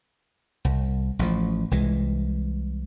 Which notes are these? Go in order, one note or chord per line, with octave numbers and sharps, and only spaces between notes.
C2
A1 F3
C2 E3 G#3